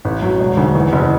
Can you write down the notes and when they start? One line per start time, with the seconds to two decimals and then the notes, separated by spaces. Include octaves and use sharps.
0.05 A1
0.22 F#3
0.40 E1
0.57 D2
0.75 E2
0.93 F#1